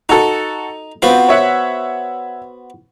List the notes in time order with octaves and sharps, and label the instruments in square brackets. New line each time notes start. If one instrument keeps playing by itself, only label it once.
[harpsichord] D#4 [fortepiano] F#4 A4
[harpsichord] B3 F#4 C5 [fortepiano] C4 F4
[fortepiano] C#5 E5 F#5